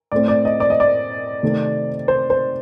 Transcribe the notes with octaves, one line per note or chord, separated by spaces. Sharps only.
A2 A3 C4 D5
D5
D#5
D5
D#5
D5
C3 D#3 A3 C4
C5
C5